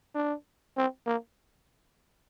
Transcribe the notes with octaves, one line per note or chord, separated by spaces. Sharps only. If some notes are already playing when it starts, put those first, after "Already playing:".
D4
C4
A#3